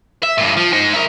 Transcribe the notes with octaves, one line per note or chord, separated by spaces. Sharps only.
E5
G2 A#2
F3
D#4 C5
E4 A#4